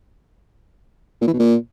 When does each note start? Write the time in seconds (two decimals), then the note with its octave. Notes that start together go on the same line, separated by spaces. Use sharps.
1.21 A#2
1.27 E3
1.33 B2
1.39 A#2